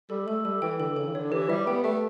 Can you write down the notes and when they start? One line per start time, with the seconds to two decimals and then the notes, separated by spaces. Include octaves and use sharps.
0.10 G3 A4
0.27 A3 A4
0.45 G3 A4
0.62 E3 G5
0.80 D3 A4
0.96 C#3 A4
1.08 E3
1.14 D3 C#5
1.32 E3 G4
1.49 G3 E5
1.67 B3 G5
1.84 A3 E5